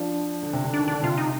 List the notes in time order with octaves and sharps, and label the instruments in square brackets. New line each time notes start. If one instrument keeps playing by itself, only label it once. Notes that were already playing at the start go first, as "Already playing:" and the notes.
Already playing: [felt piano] F3 [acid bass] D4
[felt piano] D3
C3
D3
[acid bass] D4
[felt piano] D#3
[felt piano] D3 [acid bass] D4
[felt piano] C3 [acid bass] F4
[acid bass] D#4